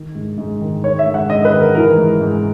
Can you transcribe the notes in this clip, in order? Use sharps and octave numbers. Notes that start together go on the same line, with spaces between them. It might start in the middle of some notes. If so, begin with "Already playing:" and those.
Already playing: D#3
G#2
G#2
D#3
D#3 C#5
E5
G#2
F#5
G#2 D#5
B4
D#3
A#4
E3 A#4
G#2
G#2